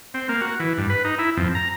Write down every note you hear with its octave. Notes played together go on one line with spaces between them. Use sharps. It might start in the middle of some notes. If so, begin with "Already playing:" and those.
C4
A#3
F#4
E3
G2
B4
D#4
E4
F2
A#5